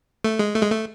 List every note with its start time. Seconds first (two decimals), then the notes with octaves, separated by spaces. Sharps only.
0.24 A3
0.39 G#3
0.55 A3
0.62 G#3
0.71 A3